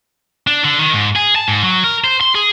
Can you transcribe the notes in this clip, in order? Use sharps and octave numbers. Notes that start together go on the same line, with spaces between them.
D4
D3
D#3
G#2
G#4
A5
G#2
F#3
A#4
C5
C6
G#4